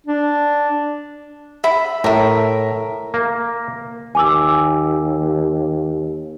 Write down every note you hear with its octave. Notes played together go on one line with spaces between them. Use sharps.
D4
E5 B5
A2 A#4 E5
A#3
D#2 G#5 D6 E6